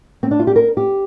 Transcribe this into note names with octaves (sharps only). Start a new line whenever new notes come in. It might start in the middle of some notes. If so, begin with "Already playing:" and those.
C4
D4
F4
G4
A#4
G4